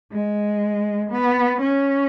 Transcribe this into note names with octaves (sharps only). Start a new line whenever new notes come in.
G#3
B3
C#4